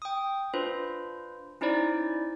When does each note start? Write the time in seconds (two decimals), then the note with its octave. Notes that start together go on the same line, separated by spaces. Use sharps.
0.02 G5 D#6
0.54 D4 F4 B4 C5
1.61 C#4 D#4 E4 C5 D5